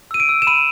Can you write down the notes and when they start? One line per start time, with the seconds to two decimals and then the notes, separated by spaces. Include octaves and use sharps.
0.11 E6 D#7
0.20 D7
0.29 E6
0.42 E7
0.47 B5 D#7